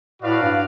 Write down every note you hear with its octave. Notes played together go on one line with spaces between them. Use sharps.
A2 F#4 B4 D5 F5
G2